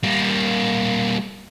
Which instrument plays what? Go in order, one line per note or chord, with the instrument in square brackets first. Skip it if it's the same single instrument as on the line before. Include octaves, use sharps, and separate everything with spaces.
[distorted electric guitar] G3 A#3